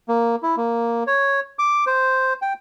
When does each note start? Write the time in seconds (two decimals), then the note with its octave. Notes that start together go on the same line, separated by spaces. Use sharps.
0.08 A#3
0.43 E4
0.57 A#3
1.07 C#5
1.59 D6
1.86 C5
2.42 G5